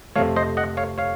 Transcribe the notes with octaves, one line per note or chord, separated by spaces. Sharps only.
F2 C3 F3 A3 C#5 F5
C5 D#5
D#5 F#5
C#5 F5
C#5 F5